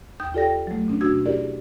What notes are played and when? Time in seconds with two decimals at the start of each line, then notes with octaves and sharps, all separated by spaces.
0.20 D#2 G5 D#6 G6
0.34 F4 G4 A4 D5 G5 A#6
0.67 F#3 A3
0.88 B2 C#4 D4
1.01 B2 D4 F#4 E6 G#6
1.26 E4 G4 G#4 A#4 D5